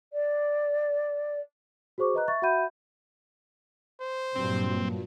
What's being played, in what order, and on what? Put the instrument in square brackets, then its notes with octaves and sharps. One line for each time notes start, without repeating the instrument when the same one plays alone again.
[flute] D5
[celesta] F#4 G#4 C5 C#6 D6
B4 D#5 A#5 F#6
E5 C#6 A6
F#4 E5 F#5 B5 G6 D#7
[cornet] C5
[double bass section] G2 [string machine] A#2 F#3 [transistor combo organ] C4